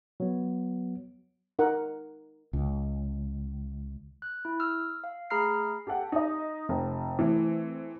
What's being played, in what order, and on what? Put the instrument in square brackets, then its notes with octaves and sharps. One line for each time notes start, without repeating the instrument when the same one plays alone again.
[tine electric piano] F#3 B3
[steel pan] D#4 A#4 F#5
[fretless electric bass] C#2
[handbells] F#6
E4
E6 F6
F5
A3 G#4 A#5 B5 F6 C7
[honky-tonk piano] G4 A4 F#5 G5
D#4 D#5
F1
E3 A3 C4